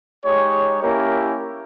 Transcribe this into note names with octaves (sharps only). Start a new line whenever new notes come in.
G#3 D#4 G4 C#5
A#3 C#4 E4 G4 A#4